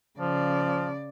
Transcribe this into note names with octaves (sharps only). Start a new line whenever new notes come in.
C#3 F3 D5